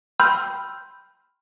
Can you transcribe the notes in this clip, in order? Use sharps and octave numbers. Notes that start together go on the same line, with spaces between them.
G5 B5 C6 E6 F6 G6